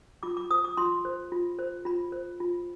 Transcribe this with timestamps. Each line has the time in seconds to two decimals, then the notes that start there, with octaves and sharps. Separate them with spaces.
0.23 F4 D6
0.37 D6
0.51 C5 D#6
0.64 D6
0.77 F4 C6
1.05 C5
1.32 F4
1.59 C5
1.85 F4 B5
2.12 C5
2.40 F4